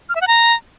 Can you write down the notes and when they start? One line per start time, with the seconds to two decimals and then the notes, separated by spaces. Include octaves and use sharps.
0.09 F6
0.15 E5
0.21 F#5
0.27 A#5